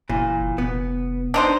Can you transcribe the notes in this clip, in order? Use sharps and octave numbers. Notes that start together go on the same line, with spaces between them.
F#1 A#2 E3
F1 B3
D4 D#4 C5